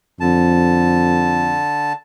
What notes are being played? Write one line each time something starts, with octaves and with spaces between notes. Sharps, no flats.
F2 D3 A5